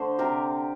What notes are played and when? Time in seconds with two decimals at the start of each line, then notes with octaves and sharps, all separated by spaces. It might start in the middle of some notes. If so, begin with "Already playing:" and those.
Already playing: D3 A3 C5
0.19 C3 G4 A#4